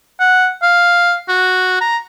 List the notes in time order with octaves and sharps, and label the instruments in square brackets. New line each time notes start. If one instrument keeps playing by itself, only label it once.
[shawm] F#5
F5
F#4
A#5